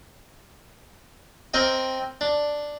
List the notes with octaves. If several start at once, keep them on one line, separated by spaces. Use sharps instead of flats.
C4 A#4 D#5 G5
D4